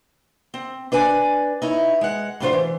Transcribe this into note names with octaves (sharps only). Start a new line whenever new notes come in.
C4
D4 B4 D5 G#5
D#4 E4 C#5
G#3 F#5
A2 F#3 D4 F4 B4 C5
E3